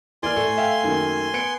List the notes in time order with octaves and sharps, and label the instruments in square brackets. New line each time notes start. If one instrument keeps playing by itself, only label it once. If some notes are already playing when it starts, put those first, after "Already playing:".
[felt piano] E3 A#3 F6 [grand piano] D5 [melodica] G#5 C6
[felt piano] A2 [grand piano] A3
[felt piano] E5 F5 G5
F#2 D#3 A#3
B3 C#7 D7